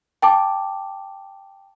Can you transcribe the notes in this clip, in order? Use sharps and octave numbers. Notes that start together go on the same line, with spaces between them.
G5 A5 D6